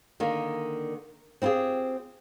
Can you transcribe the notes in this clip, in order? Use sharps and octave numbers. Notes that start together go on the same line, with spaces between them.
D3 D#3 A#3
C4 E4 F4 G4 G#4